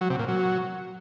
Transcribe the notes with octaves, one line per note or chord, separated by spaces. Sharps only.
F#3
C3
A#2
F#3